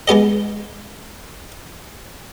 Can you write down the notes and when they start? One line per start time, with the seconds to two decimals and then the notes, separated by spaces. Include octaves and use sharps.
0.08 G#3 B3 G4 D#5